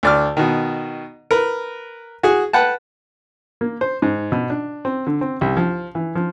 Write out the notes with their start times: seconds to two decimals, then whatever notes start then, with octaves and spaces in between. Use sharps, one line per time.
0.03 D2 D5 F6
0.37 B2 D#3
1.31 A#4 B4
2.23 F#4 G#4
2.53 B4 F#5 G5 A5
3.61 A#3
3.81 C5
4.02 G#2
4.32 B2
4.50 D4
4.85 C4
5.07 D3
5.21 C4
5.41 C2
5.57 F3
5.95 E3
6.15 F3